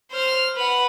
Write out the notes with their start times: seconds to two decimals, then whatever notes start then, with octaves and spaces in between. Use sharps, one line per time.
0.12 C5 F6
0.56 B4 F#5